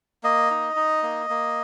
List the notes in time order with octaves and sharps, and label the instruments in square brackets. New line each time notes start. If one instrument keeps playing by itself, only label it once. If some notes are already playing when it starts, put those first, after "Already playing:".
[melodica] A#3 D#5
D#4
D#4
A#3
A#3